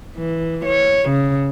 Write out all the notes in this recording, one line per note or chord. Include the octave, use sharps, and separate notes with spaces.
E3
C#5
C#3